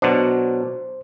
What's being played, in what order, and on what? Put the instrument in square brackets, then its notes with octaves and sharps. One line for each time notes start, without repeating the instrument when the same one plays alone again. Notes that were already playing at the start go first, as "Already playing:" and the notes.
[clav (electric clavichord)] B2 F#3 D4 [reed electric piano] C5